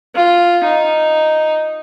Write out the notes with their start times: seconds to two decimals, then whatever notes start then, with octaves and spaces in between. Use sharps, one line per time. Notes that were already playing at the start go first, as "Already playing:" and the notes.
0.15 F4
0.64 D#4